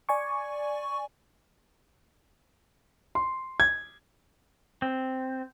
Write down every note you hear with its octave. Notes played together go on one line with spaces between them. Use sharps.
D5 G#5 C#6
C6
G#6
C4